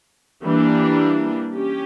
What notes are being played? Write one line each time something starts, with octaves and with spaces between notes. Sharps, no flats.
E3 G3 A#3 D4
C#4 G4